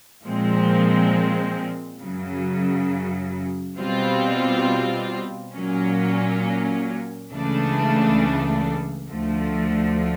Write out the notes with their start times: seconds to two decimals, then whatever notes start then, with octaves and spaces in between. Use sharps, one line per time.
0.24 A#2 F3 G#3 C4
2.00 F#2 C#3 F#3
3.78 B2 G3 C4 F4
5.54 A#2 F#3 A#3 C#4
7.31 C#2 C#3 E3 A3 D4
9.08 D2 D3 F3 A3